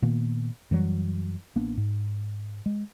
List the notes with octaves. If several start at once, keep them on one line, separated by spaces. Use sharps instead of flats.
A#2 D#3 A#3 B3
F#2 E3 F#3 G3
A1 A#3 B3 D4
G#2
G#3